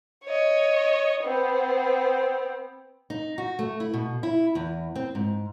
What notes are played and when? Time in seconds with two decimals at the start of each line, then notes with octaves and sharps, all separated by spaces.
0.24 C#5 D#5
1.24 B3 C4
3.10 D#4
3.38 F#4
3.59 A3
3.80 E4
3.94 B2
4.23 E4
4.55 E2
4.95 C4
5.15 G#2